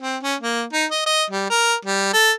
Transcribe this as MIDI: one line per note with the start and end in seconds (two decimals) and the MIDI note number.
0.02 0.17 60
0.23 0.35 61
0.41 0.63 58
0.73 0.86 63
0.91 1.04 75
1.06 1.24 75
1.31 1.47 55
1.50 1.75 70
1.85 2.09 55
2.13 2.32 69